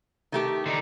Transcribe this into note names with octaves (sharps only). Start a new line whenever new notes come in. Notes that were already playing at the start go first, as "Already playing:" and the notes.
D#3 A3 G4
D3 D#4